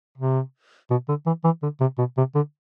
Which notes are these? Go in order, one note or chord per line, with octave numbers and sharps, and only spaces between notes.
C3
B2
D3
E3
E3
D3
C3
B2
C3
D3